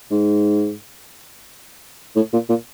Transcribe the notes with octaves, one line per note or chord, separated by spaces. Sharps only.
G#2
A2
A#2
A#2